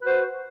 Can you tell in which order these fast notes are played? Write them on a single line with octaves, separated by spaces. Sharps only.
B4 F#4 C5